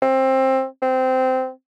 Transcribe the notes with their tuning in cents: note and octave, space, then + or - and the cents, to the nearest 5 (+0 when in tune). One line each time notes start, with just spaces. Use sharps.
C4 +20
C4 -15